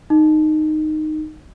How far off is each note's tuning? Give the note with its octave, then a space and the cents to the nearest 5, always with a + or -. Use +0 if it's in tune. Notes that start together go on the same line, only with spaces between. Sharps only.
D#4 -10